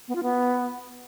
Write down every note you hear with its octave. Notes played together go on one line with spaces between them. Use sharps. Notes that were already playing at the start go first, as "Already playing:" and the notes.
B3
F4
B3